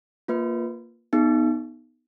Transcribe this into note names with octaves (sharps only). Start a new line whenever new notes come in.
A#3 F4 B4
B3 D#4 G#4